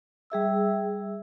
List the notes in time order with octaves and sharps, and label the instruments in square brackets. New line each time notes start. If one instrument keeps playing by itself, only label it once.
[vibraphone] G3 G#4 E5 E6